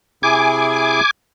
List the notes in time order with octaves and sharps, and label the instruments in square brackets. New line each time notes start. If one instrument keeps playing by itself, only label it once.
[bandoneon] C3 E4 G#4 [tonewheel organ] G#5 D6